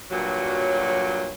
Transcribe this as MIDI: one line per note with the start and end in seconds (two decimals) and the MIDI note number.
0.11 1.31 43
0.11 1.31 46
0.11 1.31 54